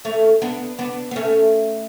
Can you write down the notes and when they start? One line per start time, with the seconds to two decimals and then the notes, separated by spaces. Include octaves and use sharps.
0.05 A3 C#4
0.42 B3 D4
0.79 B3 D4
1.11 B3
1.16 A3 C#4